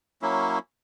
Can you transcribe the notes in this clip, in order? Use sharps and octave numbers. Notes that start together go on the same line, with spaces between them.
F#3 A#3 C#4 E4